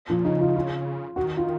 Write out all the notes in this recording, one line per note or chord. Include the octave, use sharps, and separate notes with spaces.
A#2 F3
C#3 D#4
F4
F4
D#3 F#4
F4